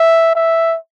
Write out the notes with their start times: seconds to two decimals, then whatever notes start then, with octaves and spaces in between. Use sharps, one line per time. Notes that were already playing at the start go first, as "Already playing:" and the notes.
Already playing: E5
0.35 E5